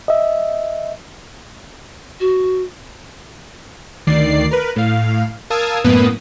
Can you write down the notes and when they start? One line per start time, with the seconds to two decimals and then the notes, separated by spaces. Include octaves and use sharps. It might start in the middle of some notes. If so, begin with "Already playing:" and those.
0.08 D#5 E5
2.20 F#4
4.07 D2 D#3 D5 C7
4.51 A#4 B4
4.76 A2 F5
5.50 A#4 F5 A5 D#6 E6 G#6
5.84 F#2 A2 A#3 B3 B4 D#6